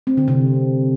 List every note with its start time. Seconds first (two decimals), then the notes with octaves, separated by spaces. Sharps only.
0.07 C4
0.17 D3
0.28 C3